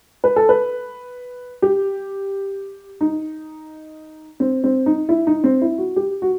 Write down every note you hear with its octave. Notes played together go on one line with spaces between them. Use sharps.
B4
A4
B4
G4
D#4
C4
C4
D#4
E4
D#4
C4
E4
F#4
G4
F#4